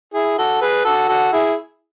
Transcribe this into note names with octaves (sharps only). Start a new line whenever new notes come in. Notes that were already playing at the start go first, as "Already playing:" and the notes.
E4 G#4
F#4 A4
G#4 B4
F#4 A4
F#4 A4
E4 G#4